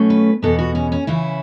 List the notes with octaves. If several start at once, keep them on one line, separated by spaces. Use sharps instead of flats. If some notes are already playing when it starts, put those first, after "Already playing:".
Already playing: B2 F#3 A3 C#4
B4
E2 B2 B3 A4
F#4
C#4
C#4
C#3 E3 C#4 E4